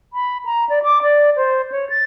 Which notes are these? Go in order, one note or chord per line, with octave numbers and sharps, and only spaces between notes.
B5
A#5
D5
D6
D5
C5
C#5
A6